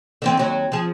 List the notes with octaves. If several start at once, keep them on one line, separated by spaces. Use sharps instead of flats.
D3 E3 C4
D#2 F#3
F3 G#4